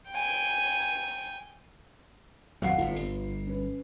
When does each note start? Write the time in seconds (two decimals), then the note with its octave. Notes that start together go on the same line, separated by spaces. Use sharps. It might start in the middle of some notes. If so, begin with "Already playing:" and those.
0.11 G5 G#5
2.62 G#1 F2 F#3 F5 F#5 C7
2.78 G1 A2 F4
2.96 G1
3.47 C#4 B4